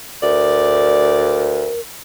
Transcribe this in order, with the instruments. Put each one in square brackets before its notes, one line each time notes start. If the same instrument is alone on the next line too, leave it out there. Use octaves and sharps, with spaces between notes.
[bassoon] D2 [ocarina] A#4 [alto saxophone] D5